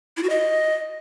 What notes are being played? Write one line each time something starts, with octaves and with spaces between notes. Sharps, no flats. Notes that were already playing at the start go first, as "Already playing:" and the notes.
E4
F#4
D#5